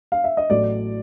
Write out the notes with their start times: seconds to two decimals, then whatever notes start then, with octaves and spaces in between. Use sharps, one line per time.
0.12 F5
0.24 E5
0.37 D#5
0.50 A1 A2 F#3 A3 D5